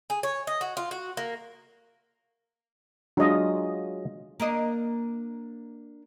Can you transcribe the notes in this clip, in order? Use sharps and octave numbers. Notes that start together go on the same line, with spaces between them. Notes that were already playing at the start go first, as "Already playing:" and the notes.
G#4
C#5
D#5
F#4
F4
F#4
A#3
F#3 G#3 D4 F4 D#5
A#3 D4 D#5